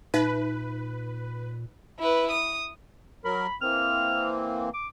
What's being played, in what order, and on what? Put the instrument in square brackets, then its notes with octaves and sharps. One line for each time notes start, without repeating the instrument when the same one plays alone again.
[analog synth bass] A#2 [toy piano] D#4 E5 [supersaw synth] B4
[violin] E4 B4
D#6
[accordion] F#3 A#4 [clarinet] B5
[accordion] E3 A#3 C4 [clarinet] F6
[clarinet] D6